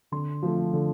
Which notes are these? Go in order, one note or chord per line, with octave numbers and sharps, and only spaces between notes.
D3 C6
F3 A3
D3